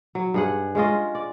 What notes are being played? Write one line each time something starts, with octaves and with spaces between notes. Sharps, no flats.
F#3
G2 G#4 F#5
G#3 C#4 F4 D#5
D5